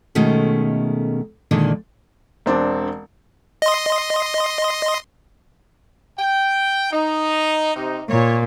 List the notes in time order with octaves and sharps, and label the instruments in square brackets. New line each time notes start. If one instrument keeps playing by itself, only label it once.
[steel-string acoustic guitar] B2 D#3 G#3 A3 C#4
A#2 D3 D#3 G#3
[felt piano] E1 C4 D4 A5
[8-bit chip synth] D#5 C6
[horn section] G5
D#4
C3 D#4
[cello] A#2 [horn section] C#5